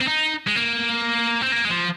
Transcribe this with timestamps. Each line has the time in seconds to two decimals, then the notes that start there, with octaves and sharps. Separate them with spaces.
0.01 C4
0.08 D#4
0.48 G#3
0.56 A#3
1.42 C4
1.52 A#3
1.65 G#3
1.70 F3